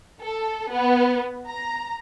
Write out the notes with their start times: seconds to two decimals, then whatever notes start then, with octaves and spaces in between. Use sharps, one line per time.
0.23 A4
0.70 B3
1.48 A#5